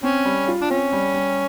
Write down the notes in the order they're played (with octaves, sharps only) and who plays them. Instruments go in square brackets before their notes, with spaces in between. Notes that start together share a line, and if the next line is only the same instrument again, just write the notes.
[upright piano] C4 [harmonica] C#4
[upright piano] G3
F4
[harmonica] D4
[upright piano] C4 [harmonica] C#4
[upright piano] G3
G3